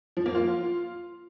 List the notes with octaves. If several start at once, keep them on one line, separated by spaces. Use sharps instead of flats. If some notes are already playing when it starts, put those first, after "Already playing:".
F3
A#3
F4